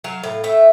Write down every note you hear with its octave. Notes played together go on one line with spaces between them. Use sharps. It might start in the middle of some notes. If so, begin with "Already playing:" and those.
F#3 F5
A2
A3 E5